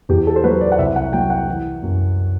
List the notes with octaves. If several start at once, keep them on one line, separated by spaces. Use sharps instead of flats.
E2 G4
A4
C5
F#3 B4
D5
F#5
C2 E5
F#5
F#3 G5
F#5
E3
F#2